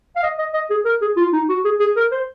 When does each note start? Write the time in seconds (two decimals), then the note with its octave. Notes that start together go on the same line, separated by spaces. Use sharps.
0.16 F5
0.23 D#5
0.38 D#5
0.53 D#5
0.70 G#4
0.85 A#4
1.01 G#4
1.16 F4
1.33 D#4
1.49 F#4
1.64 G#4
1.80 G#4
1.96 A#4
2.11 C5